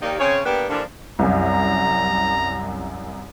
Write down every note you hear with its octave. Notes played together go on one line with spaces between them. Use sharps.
D#2 D#3 A#3 D#4 G4 D5
C#3 C4 C#4 G#4 C#5
G3 A#3 B3 D4 G4
D3 E3 F3 G3 A#3 D4
C2 F#2 A#5